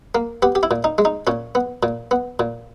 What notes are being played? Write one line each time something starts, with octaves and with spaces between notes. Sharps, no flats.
A#3
B3 G4
G4
E4
A#2
D#4
G#3
D#4
A#2 C#4
B3
A#2
B3
A#2